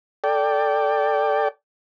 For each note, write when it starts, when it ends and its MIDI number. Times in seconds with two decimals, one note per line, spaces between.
0.24 1.48 69
0.24 1.48 74
0.24 1.48 79